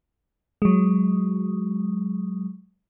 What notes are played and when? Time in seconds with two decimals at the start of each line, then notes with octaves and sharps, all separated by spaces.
0.62 F#3 G#3